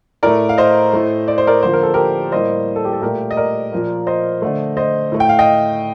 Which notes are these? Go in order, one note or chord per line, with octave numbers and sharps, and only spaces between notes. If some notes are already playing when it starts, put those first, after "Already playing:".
A2 A3 A#4 D5
F5
C5 D#5
A2 A3
D5
C5
A#4 D5
D3 F3 A#3 C5
A#4
A4
G4 A#4
A2 G3 A#3 C5 D#5
A4
G4
A4
A#2 A3 G4 A#4
D#5
A#4 D5
A#2 F3 A#3
C5 D#5
D3 A3
C5 D#5
A2 A3
G5
F5
D#5 G5